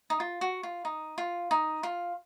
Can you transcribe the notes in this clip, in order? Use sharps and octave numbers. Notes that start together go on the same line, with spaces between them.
D#4
F4
F#4
F4
D#4
F4
D#4
F4